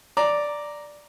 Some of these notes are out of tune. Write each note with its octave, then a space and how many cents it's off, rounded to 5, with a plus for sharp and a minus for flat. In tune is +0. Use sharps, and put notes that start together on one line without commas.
D5 +0 A#5 +0